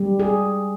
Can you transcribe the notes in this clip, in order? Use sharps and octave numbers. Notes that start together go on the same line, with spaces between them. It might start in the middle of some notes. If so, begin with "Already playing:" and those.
Already playing: G3
G#4